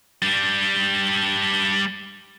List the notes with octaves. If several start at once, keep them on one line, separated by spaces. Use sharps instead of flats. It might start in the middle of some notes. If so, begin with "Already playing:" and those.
G3 D4